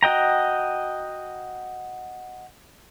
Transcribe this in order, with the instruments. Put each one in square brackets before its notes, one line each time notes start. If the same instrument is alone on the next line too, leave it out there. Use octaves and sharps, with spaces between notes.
[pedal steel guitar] F#4 D#5 G5 A#5